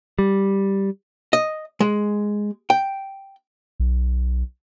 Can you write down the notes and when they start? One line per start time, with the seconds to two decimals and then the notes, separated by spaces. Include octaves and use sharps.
0.19 G3
1.33 D#5
1.80 G#3
2.70 G5
3.80 B1